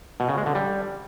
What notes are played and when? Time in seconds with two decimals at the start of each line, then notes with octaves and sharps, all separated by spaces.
0.20 B2
0.29 C#3
0.37 G#3
0.46 D3
0.55 G3